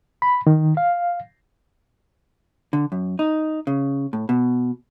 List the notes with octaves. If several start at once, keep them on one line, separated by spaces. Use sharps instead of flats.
B5
D#3
F5
D3
F#2
D#4
C#3
A2
B2